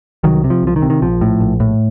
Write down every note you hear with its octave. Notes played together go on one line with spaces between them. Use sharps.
C2 D#3 F#3
C3
F3
C2 F3
D#3
C3
D#3
A#1 F3
A2
A#1
A2